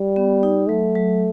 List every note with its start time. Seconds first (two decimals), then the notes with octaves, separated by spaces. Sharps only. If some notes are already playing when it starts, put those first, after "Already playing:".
Already playing: G3
0.16 B3
0.43 D#4
0.69 F#3 A3
0.95 F#3